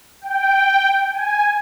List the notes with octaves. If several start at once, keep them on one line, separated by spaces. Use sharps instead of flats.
G5
G#5